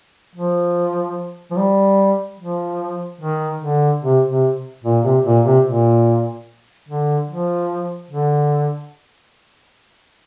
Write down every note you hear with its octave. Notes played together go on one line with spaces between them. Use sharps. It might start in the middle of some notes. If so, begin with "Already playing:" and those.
F3
F3
G3
F3
D#3
D3
C3
C3
A#2
C3
A#2
C3
A#2
D3
F3
D3